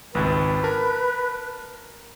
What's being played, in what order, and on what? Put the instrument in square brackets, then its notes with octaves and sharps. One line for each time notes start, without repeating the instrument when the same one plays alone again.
[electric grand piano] G#1 C#2 [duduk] B4
[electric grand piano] A#4 A5 B5